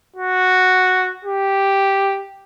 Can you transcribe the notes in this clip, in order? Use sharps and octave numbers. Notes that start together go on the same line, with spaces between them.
F#4
G4